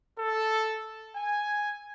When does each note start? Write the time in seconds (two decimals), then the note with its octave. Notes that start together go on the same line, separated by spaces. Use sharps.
0.19 A4
1.16 G#5